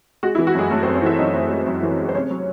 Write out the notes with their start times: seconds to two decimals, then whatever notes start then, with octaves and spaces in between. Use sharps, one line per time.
0.23 G#3 F#4
0.35 E4
0.38 E3
0.47 F#4
0.55 F#2 G#3 G#4
0.71 F#2 A3 A4
0.83 C4 C5
0.87 F#2
0.95 C#4 C#5
1.02 E3 E4 E5
1.19 F#2 D#4 D#5
1.34 F#2
1.51 G#3
1.67 F#2
1.83 E3
1.99 G#3
2.09 C5
2.15 C3 C#4 C#5
2.30 F#3